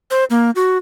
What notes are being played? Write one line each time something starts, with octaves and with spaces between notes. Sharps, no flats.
C5
A#3
F#4